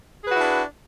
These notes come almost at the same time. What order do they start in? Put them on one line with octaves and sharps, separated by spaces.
G#4 B4 F#4 E4 D4